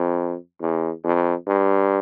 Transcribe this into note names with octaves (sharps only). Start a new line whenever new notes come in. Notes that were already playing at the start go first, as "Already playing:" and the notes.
Already playing: F2
E2
F2
G2